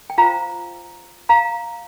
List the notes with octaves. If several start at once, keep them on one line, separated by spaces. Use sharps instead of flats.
G5
F4 C5 F5 A#5
F5 A#5